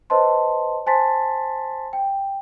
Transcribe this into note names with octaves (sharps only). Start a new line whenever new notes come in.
B4 C5 D#5 A5 C6
C5 G#5 A5 C6 A6 B6
G5